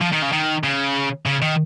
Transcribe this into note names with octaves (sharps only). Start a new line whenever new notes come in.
F3
D#3
C#3
D#3
C#3
C#3
D#3